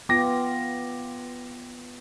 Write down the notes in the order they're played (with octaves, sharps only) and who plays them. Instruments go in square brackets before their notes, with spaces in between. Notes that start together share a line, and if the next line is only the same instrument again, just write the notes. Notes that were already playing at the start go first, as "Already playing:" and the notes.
[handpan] B3 F4 [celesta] G5 [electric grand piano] D6 A#6